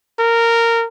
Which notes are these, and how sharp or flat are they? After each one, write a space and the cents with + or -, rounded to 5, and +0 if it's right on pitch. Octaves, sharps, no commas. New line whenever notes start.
A#4 -15